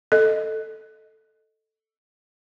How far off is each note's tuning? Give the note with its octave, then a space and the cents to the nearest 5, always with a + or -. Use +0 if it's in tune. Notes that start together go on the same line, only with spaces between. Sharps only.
A4 +0 D#5 +0